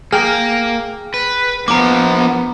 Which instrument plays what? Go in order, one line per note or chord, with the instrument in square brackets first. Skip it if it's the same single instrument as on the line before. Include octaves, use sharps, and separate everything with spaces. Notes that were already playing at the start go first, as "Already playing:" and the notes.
[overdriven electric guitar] A#3 A#4 [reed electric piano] G#4 G5 [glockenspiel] F6
[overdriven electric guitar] B4
[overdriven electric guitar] F3 A#3 [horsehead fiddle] B3 [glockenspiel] A#5 D6